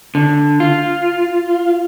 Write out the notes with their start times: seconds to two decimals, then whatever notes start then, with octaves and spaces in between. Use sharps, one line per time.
0.15 D3
0.60 F4